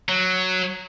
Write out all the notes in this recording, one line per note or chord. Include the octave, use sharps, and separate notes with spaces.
F#3